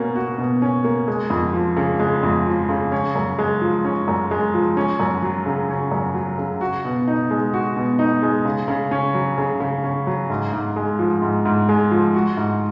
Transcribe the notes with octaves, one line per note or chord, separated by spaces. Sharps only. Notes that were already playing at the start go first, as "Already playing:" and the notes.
Already playing: B2 A#3 C#4
F#4
B2
C#4
A#3
G#3
F2
F3
C#3
G#3
F2
F3
C#3
C#4
F#2
G#3
F3
C#4
F#2
G#3
F3
C#4
F#2
F#3
C#3
C#4
F#2
F#3
C#3
F#4
B2
D#4
G#3
F#4
B2
D#4
G#3
C#3
C#3
C#4
F#3
C#3
C#3
C#4
F#3
G#2
G#2
G#3
F3
G#2
G#2
G#3
F3
F#4
G#2